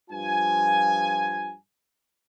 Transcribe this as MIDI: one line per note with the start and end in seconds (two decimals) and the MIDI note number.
0.10 1.54 43
0.10 1.54 53
0.10 1.54 65
0.10 1.54 80